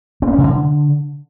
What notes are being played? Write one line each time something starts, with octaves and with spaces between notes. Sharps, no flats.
C4
A#3
C#4
C3
D3